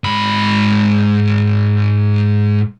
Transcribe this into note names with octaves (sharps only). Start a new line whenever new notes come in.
G#2 B5